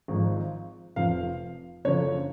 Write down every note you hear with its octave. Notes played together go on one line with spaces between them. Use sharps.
G#1 G#2 F3
F1 F2 F3 F5
F#1 F#2 D3 F3 C#5